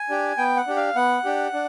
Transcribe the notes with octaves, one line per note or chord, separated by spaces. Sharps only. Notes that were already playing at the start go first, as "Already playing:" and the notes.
Already playing: G#5
D4 G4
B3 G5
F#5
D4 G4
F5
B3 F#5
D4 G4
D4